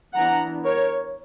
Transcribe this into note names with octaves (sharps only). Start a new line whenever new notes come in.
E3 B3 D4 F#5 A#5
A#4 C#5